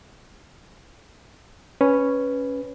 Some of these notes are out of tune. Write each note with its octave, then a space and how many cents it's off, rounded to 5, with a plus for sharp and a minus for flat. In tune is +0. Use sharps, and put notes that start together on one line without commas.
C#4 +0 B4 +0